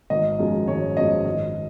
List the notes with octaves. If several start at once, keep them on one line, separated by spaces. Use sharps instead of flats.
G#1 D#5
F#2 F3 G#3
G#1 C#5
F#2 F3 G#3 D#5
G#1 D#5